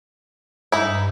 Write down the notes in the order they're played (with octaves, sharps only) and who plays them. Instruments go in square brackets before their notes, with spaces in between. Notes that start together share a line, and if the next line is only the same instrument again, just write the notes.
[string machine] G2 [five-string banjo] D#4 E4